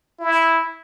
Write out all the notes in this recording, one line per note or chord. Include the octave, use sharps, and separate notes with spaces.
E4